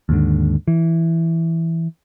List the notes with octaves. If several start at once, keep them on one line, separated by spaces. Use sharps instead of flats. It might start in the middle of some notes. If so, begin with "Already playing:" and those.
D#2 G#2 D3
E3